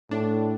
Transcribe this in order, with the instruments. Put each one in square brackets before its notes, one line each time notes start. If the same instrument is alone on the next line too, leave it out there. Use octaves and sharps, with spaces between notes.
[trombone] A2 [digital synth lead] D4